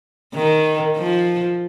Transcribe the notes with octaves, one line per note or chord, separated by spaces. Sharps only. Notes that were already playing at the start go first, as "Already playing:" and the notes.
D#3
F3